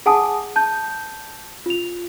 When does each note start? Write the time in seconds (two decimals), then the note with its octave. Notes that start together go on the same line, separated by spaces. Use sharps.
0.06 G#4 F#5 G#5 A5 D#6
0.56 A5 G6
1.66 F4 F7